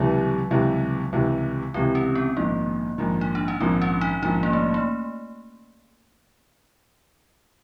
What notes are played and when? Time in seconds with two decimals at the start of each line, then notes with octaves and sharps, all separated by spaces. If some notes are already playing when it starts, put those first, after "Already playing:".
Already playing: C#2 C3 E3 F#3 G3
0.51 C#2 C3 E3 G3
1.13 C#2 C3 E3 G3
1.74 C#2 C3 E3 G3 C4
1.95 C#4
2.15 B3
2.37 A#1 G#2 D#3 A#3
2.98 A#1 G#2 D#3
3.21 D#4
3.35 D4
3.48 C#4
3.60 A#1 G#2 D#3 C4
3.82 C#4
4.01 D#4
4.22 A#1 G#2 D#3 D#4
4.43 A#3
4.53 A3
4.74 A3